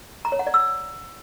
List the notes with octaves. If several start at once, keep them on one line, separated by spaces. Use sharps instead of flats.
A#5
C#5
F#5
D5
E6